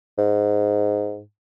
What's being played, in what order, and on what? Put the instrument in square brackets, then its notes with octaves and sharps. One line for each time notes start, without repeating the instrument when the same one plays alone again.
[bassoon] G#2